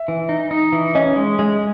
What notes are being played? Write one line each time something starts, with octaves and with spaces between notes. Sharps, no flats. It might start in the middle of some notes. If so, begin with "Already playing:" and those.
Already playing: E5
E3
D#4
D#4
E3
C#4 D#5
G#3
G#3